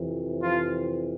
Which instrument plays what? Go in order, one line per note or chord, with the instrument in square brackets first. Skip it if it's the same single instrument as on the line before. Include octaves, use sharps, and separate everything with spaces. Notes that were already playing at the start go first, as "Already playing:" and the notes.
Already playing: [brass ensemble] F2 C3 E3
F3 F4